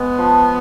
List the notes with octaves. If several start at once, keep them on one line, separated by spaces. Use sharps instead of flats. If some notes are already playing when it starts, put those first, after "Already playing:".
Already playing: G#3 B3
F3